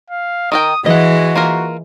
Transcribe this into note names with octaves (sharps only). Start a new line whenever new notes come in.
F5
D#3 A#4 G5 D#6
E3 G#3 F#4 D#5 F#5
A#3 F4 A#4